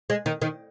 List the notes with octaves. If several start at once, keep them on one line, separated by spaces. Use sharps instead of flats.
G#3
D#3
D#3